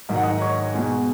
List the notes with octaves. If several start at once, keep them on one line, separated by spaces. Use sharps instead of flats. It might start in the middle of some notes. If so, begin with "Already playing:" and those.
G#2 D#3 F#3 D#5
F#5
D#4 D#5
C#5 C#6
B2 G#3